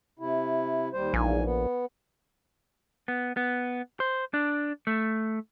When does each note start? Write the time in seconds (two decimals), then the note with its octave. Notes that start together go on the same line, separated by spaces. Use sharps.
0.19 C3 E4
0.93 D#2 G3 C5
1.14 A#1 E2 G#2 G#5
1.45 B3
3.08 B3
3.37 B3
4.00 C5
4.34 D4
4.87 A3